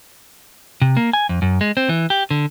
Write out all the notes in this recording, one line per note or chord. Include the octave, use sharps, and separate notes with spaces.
C3
A#3
G#5
F2
F#2
G#3
C4
E3
G4
D3